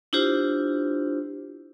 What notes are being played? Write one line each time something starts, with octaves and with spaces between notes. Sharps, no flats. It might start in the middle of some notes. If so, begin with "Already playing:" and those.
D4 E4 F4 G4 C5